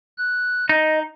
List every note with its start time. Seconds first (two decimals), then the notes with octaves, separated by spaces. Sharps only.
0.18 F#6
0.69 D#4 D#5